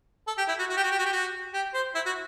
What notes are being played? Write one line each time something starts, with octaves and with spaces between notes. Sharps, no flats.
A4
G4
E4
F#4
F#4
G4
F#4
G4
F#4
G4
F#4
G4
C5
E4
F#4